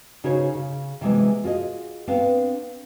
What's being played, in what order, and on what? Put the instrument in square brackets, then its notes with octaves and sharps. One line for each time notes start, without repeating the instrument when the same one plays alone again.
[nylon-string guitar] C#3 D#4 F#4 G#4 C5 C#5
C#3
C3 E3 F#3 G#3 B3
F4 F#4 G#4 D#5
B3 C4 D4 F5